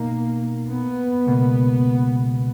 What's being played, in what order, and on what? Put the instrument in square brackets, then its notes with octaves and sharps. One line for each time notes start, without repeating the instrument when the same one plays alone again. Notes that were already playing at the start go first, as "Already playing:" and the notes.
Already playing: [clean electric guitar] B2 D#4 [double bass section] A#3
[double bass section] B3
[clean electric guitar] C#2 B2 A#3